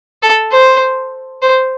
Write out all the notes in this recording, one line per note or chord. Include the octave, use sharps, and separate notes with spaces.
A4
C5
C5